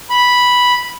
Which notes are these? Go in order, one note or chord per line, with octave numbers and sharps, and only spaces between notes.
B5